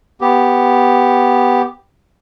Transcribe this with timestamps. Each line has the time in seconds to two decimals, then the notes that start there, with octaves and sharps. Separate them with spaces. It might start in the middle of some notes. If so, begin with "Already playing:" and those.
0.21 B3 G4